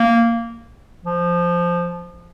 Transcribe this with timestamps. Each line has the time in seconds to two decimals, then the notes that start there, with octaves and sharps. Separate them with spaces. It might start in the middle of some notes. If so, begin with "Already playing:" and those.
Already playing: A#3
1.05 F3